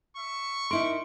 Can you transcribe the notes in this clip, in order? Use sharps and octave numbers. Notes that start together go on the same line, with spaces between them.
E5 C#6
D#4 E4 A#4 C6 C#7 D7